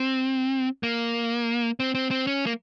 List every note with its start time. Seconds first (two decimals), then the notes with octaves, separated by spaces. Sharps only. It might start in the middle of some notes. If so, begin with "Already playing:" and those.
Already playing: C4
0.83 A#3
1.80 C4
1.95 C4
2.11 C4
2.27 C#4
2.46 A#3